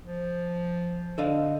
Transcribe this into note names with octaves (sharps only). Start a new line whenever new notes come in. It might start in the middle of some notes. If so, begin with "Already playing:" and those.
F3
D3 A4 D#5 F5